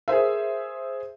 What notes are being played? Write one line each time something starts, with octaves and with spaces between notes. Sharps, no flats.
G#4 A#4 C5 E5